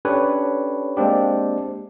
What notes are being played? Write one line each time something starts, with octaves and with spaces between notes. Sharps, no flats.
C#4 D4 G4 A4 B4 C#5
G#3 A#3 C4 D4 G4